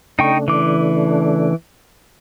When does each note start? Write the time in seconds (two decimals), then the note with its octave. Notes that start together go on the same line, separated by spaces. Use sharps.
0.19 C#3 A3 D4 D#4 G5 C#6
0.48 E3 D6